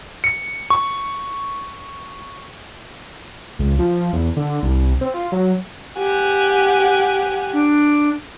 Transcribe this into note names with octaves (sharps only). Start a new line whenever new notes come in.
C#7
C#6
C#2
F3
E2
D3
C2
C4
F4
F#3
G4 F#5 G#5
D4